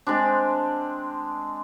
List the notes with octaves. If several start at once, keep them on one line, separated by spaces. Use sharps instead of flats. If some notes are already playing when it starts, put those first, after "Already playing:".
G#3 C4 D4